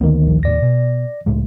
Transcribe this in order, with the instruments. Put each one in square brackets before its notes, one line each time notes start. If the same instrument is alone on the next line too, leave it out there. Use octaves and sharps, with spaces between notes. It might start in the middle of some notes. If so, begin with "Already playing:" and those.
[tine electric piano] D2 D#3 [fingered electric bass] D3 A#3 B3
[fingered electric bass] A1 F3
[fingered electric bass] D#2 A2 [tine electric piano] D5 A#6
[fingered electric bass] B2
C#2 A2 G#3